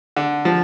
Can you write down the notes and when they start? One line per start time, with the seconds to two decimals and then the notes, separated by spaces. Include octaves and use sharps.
0.17 D3
0.45 F3